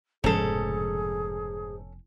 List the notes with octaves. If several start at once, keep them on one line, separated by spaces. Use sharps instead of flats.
F1 G#2 B2 F3 C#4 G#4 A4